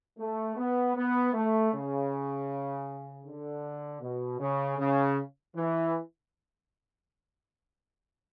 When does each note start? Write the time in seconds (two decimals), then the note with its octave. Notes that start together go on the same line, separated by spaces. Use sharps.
0.18 A3
0.56 B3
0.95 B3
1.33 A3
1.72 C#3
3.24 D3
4.00 B2
4.39 C#3
4.78 C#3
5.55 E3